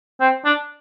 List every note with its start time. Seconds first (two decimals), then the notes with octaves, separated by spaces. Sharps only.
0.20 C4
0.45 D4